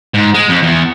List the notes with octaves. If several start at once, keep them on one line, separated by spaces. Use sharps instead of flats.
G#2
G#3
F2
E2